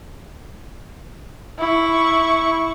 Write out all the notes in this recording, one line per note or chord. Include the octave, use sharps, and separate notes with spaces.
E4 C#6